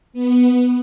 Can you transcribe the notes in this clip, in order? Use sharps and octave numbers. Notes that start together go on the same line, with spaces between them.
B3